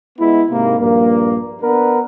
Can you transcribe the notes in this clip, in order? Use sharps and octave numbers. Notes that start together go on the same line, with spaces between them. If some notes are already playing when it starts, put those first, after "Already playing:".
G#3 B3 E4
G#2 C3 A#3
A#1 G2 A#3
B3 D4 A#4 B4